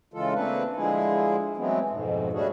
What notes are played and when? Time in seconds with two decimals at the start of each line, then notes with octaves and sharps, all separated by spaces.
0.14 C#3 E3 G#3 F4 A4
0.34 A3 A#3 C4 D4 B4
0.76 D3 F3 G#3 E4 G#4
1.57 E3 F#3 G#3 A3 B3 C4
1.90 F2 G#2 B2
2.33 G3 A3 C#4 D4 F#4 G#4